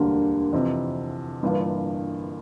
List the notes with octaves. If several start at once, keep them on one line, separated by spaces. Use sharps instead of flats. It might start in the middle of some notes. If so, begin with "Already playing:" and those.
Already playing: E1 D2 D3 G3 A#3
F2 C3 E3
G1 G2 E3 A#3 F4